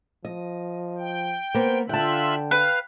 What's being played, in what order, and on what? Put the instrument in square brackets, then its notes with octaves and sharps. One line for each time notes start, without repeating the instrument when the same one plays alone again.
[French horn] F3 [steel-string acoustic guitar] D#5
[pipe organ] G5
[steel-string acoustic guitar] A#3 B3 [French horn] C5
[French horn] D3 [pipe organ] F4 E5 F#6 [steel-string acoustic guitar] G5 A5
[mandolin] B4 [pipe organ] F5